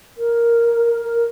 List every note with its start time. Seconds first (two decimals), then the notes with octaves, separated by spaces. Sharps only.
0.17 A#4
1.01 A#4